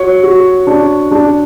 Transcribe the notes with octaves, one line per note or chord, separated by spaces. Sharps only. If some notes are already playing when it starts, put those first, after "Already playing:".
Already playing: F#4 C#5
F#4
D4
D4